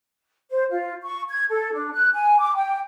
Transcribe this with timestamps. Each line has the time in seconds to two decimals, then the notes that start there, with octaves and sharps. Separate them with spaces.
0.51 C5
0.70 F4
1.01 C#6
1.28 G#6
1.49 A4
1.72 D4
1.93 F#6
2.13 G#5
2.40 D6
2.55 G5